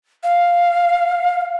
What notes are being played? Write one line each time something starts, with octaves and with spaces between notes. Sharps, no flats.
F5